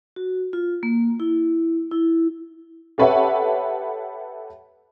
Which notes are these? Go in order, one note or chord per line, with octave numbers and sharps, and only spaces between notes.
F#4
F4
A#3
E4
E4
G4 A4 B4 C#5 E5 F#5